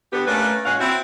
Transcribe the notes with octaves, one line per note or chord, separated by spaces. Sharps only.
D3 B3 G4
A3 A#3 C#4 D4 B4
A#2 G#3 C#4 C#5 F5 F#5
C4 E4 F#4